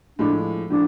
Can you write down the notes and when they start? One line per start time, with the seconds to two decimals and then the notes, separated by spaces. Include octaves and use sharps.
0.19 A2 F3 G#3 D4
0.70 A2 F3 D4